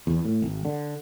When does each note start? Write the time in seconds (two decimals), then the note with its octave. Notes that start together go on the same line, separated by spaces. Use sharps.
0.07 E2
0.25 A2
0.42 G#1
0.65 D3